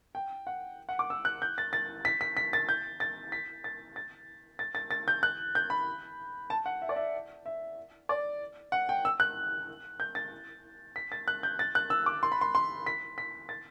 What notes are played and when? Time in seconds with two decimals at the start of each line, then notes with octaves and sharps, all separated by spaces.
0.15 G5
0.47 F#5
0.89 F#5
0.99 D6
1.10 E6
1.25 F#6
1.42 G6
1.58 A6
1.73 A6
2.05 B6
2.21 B6
2.37 B6
2.53 A6
2.69 G6
3.00 A6
3.32 B6
3.64 A6
3.96 A6
4.59 A6
4.75 A6
4.91 A6
5.08 G6
5.23 F#6
5.55 G6
5.70 B5
6.50 A5
6.66 F#5
6.82 E5
6.89 D5
6.96 E5
7.46 E5
8.09 D5
8.72 F#5
8.89 G5
9.05 E6
9.20 F#6
10.00 G6
10.15 A6
10.96 B6
11.12 A6
11.28 F#6
11.43 G6
11.59 A6
11.75 F#6
11.90 E6
12.06 D6
12.23 C6
12.32 B5
12.41 C6
12.55 C6
12.86 B6
13.18 B6
13.49 A6